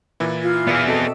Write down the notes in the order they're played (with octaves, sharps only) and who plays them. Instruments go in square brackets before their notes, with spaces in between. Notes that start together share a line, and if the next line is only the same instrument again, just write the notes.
[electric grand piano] A#2 E3 E4
[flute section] F4
[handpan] B2 D5 E5 [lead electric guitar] B3 G#4
[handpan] C4 F#4 D#5 [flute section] A4